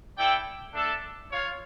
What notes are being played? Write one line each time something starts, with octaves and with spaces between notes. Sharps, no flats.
E4 A4 D5 G5
A3 D4 A4
F4 C#5 F5